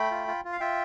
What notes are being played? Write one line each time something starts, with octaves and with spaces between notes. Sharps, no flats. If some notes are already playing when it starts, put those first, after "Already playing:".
Already playing: A3 G5 B5
F4
F4
F4
F5
F4 E5 G5